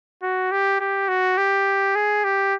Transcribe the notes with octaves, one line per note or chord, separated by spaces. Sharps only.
F#4
G4
G4
F#4
G4
G#4
G4